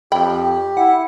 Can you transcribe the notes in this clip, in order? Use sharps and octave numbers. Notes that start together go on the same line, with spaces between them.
F2 G4 G5 B5
E4 F#5